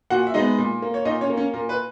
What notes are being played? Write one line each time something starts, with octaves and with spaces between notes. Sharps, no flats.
A#2 F#4 F#5
E5
G#3 B3 D#4 D#5
A#2
A#3
C#5
A#2 D#4 D#5
C#4 C#5
A#3
C#4 C#5
A#2 A#4
B4